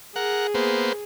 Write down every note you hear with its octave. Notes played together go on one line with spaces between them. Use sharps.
G#4 A#4 F#5
A#3 B3 C5